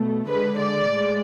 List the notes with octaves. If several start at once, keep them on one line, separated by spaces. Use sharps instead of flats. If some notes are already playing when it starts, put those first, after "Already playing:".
Already playing: B2 A3
D3 G#3 B4
D5
A2 G#3